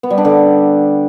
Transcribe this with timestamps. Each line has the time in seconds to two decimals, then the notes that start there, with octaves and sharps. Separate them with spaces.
0.03 B3
0.10 G3
0.18 D4
0.25 D3